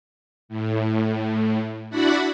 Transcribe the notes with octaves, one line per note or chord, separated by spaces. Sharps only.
A2
D4 E4 F#4 D5 F#5 B5